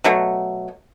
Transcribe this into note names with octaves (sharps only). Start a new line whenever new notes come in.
B2 F#3 A3